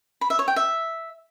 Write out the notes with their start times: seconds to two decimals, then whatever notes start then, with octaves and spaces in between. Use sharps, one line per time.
0.21 B5
0.30 E5
0.39 C#5
0.48 G5
0.56 E5